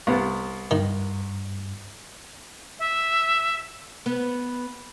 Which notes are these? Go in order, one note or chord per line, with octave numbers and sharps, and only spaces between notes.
C2 B3
G2 D#3
E5
B3